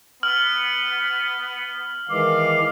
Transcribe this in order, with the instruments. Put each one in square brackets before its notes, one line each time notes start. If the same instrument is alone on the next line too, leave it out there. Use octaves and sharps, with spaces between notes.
[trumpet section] B3 [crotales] F6 F#7
[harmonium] D#3 E3 G#3 [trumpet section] F5 [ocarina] D6